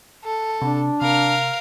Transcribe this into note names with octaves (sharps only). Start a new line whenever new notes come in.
A4
C3 D4
C3 A#4 F5 F6